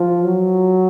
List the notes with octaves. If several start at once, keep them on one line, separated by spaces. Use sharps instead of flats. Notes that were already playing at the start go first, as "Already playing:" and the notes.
Already playing: F3
F#3